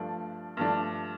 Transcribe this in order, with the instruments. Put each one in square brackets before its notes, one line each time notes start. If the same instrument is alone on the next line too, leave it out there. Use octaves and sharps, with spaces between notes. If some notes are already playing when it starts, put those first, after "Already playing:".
Already playing: [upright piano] G2 F3 A3 D4 D5
G2 F3 A3 D4